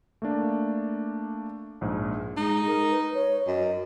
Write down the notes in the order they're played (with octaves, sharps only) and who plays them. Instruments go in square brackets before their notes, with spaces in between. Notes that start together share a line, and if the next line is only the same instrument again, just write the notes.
[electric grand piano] A3 A#3 D4
A#1 G#2
[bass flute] G#3 [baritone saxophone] D#4
[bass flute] A#4
B4
C#5
[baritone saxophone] F#2 [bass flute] D#5